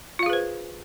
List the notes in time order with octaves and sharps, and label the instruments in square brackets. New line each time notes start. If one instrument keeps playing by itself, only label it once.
[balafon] F4
F5
G#4
B4
C5